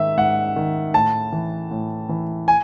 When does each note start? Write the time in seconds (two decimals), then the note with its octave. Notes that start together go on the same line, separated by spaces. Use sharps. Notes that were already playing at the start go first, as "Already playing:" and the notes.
Already playing: G#2 D#3 E5
0.17 G#2 F#5
0.56 D#3
0.94 A2 A5
1.32 E3
1.71 A2
2.09 E3
2.48 G#5